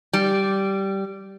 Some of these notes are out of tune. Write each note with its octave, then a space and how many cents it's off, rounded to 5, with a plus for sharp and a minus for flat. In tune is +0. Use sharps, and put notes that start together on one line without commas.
G3 -10